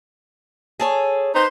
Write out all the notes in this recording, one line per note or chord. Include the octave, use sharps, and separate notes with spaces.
G#4 A4 C#5
D#4 B4 C5